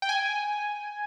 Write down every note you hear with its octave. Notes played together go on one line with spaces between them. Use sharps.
G5
G#5